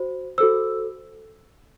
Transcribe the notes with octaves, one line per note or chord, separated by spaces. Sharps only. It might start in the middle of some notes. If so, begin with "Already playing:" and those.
Already playing: F#4 C5
F#4 A4 C5 E6